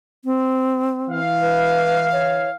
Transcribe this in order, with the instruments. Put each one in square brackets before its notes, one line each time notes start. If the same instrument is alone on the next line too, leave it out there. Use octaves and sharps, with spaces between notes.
[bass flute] C4
[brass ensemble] E3 F5
[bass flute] B4
C#5